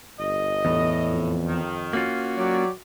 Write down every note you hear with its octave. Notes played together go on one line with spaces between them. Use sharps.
G1 D#5
E2 A2
F2
D#3
A#3 C#4 F4 F#4
F#3 G4 C#5 D5